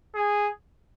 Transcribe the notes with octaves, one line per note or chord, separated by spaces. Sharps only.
G#4